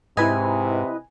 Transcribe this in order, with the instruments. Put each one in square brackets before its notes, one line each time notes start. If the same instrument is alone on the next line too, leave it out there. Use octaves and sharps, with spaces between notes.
[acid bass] G#2 [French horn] C3 [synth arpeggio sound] E4 B4 D#5 [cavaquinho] G#5